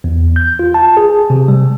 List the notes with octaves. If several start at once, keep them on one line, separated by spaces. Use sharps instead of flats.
E2
G6
F4
A5
G#4
C3
G3